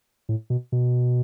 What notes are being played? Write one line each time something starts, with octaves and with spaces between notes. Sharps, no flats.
A2
B2
B2